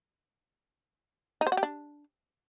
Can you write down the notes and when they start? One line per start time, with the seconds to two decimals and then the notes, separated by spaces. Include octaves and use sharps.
1.41 D#4
1.47 C5
1.52 F#4
1.57 G4
1.63 D4